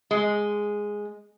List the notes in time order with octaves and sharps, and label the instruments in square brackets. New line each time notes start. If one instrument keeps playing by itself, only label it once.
[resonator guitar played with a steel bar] G#3